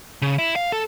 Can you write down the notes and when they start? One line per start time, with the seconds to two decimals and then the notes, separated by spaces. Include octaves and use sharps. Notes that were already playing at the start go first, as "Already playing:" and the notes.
0.22 C#3
0.39 E4
0.56 F5
0.72 A4